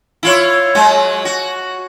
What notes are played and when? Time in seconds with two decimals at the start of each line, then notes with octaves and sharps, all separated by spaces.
0.23 E4 F4 C#5
0.75 F#3 G#3
1.25 F#4